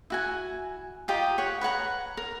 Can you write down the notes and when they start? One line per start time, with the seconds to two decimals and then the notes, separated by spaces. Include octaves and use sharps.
0.10 E4 F#4 G#5
1.08 F4 G4 D#5 A#5
1.38 C#5 F#5
1.61 B4 C#5 F#5 A#5
2.17 A#4